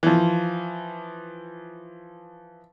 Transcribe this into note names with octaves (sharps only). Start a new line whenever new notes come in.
E3 F3